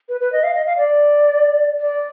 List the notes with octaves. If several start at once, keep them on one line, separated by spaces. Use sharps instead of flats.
B4
B4
D#5
F5
D#5
F5
D5
D5